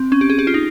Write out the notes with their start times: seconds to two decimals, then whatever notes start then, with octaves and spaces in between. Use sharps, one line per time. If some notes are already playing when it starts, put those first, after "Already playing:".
Already playing: C4
0.12 C#4
0.21 G4
0.30 G#4
0.39 G4
0.47 F4
0.54 D#4